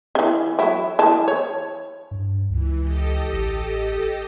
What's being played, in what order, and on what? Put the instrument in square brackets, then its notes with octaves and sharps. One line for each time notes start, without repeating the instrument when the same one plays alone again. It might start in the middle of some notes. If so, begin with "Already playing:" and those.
[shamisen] C#3 E3
F#3 E4
E3 A5
C#5
[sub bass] G2
[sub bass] C#2 [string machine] E3
[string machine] G4 A4 D#5
[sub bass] A1